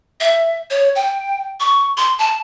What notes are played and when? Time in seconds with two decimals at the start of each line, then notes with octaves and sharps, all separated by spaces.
0.20 E5
0.70 C#5
0.95 G5
1.60 C#6
1.97 C6
2.19 A5